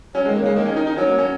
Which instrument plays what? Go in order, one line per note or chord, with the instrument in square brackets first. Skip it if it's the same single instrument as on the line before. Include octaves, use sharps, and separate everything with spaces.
[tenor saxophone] F#3 [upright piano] C#4
[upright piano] G#3
[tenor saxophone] D#3
[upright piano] A#3
[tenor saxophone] C#3 [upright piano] G#3
[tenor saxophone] D#3 [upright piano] A#3
[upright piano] C#4
D#4
D#4
[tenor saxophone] F#3 [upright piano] C#4
[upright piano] A#3
C#4